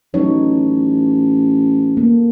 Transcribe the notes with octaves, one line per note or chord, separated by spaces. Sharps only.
A1 F#3 D#4 C#5
A#3 A4